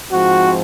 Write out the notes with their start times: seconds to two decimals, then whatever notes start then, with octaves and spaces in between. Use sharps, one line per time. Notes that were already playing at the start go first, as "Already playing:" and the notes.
0.10 G#2 F3 C4 F#4